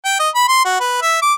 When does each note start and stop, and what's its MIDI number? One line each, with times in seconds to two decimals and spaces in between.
0.05 0.18 79
0.19 0.29 75
0.35 0.45 83
0.48 0.60 84
0.65 0.79 66
0.80 0.98 71
1.01 1.17 76
1.22 1.34 86